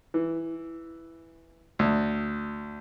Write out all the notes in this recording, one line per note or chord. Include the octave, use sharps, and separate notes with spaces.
E3
D2